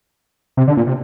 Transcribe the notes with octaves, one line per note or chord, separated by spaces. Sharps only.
C3
D3
A#2
C3